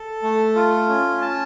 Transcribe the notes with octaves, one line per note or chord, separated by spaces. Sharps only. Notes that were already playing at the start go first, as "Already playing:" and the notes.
Already playing: A4
A3
F4
C#4
A5